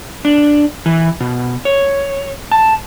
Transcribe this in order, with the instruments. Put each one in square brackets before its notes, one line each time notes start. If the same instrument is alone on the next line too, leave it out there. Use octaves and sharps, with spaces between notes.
[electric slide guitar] D4
E3
B2
C#5
A5